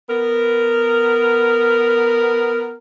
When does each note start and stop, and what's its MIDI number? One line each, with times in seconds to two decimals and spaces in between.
0.09 2.74 59
0.09 2.74 70